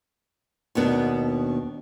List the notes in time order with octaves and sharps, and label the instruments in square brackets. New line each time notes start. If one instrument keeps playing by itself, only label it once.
[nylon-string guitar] D#2 B2 B3 D4